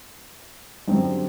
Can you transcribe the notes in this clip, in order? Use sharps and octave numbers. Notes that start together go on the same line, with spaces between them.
F#2 D3 G3 C4